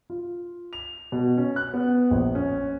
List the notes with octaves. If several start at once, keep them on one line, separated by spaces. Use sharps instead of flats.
F4
F7
B2
C#4
F#6
B3
A#1
C#4